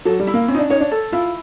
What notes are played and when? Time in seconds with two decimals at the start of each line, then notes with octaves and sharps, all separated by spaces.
0.05 F#3 A4
0.19 G3
0.27 E4
0.34 A#3
0.48 C4 C#4
0.55 D#4
0.59 D4
0.70 D#4 C#5
0.80 D4
0.91 A4
1.12 E4 F4